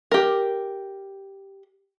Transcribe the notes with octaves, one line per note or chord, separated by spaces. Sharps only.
G4 A#4